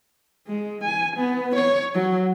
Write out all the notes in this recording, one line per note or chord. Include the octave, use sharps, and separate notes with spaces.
G#3
G#5
B3
C#5
F#3